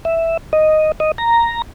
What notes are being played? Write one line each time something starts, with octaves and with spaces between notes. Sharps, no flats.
E5
D#5
D#5
A#5